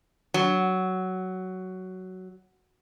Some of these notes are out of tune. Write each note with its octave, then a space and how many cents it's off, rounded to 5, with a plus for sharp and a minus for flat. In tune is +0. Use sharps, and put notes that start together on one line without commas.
F#3 +10